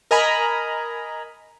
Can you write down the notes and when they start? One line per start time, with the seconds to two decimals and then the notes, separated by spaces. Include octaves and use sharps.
0.11 A#4 D#5 G#5 A#5 B5